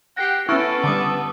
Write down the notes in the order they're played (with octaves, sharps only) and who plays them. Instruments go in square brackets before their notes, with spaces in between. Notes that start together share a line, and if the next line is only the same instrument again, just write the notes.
[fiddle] G4 G5 [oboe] F#5 [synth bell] A#6 C7
[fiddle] B3 B4 [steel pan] C#4 E4 [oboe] A4 [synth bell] C#6 F6 D7
[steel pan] D3 G3 [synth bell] A5 D6 D#6